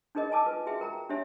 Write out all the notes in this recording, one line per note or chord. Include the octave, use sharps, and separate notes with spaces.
D4 D#4 G#4 A#4 D#5
A#4 D5 G#5 A5 D6 E6
F4 B4
F#4 G#4 E5 G5
A#4 G5 A#5
D4 G4 C#5 E5 G#5